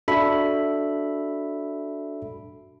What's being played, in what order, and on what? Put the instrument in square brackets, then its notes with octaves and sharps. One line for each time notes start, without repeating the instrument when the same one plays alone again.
[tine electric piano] D4 F#4 A4 E5 B5